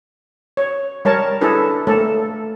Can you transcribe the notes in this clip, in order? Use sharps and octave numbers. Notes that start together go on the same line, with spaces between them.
C#5
G3 A#4 C#5 A5
D4 E4 G#4 A4 B4
A3 A#3 A4